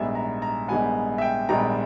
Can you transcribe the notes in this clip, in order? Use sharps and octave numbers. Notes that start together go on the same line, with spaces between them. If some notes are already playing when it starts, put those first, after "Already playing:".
Already playing: A#1 G#2 G3 B3 E5
A#5
A#5
A#1 G#2 G3 B3 G#5
E5
G5
A#1 G#2 G3 B3 A#5